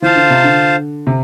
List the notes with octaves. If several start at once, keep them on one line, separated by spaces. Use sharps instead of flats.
E3 F4 C5 F5 A5
D3
C3
D3
C3